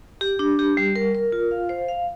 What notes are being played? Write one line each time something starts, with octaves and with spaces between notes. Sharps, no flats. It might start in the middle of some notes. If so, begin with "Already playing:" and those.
G4
D4
G4
G3
A#4
A#4
F4
F5
C5
F5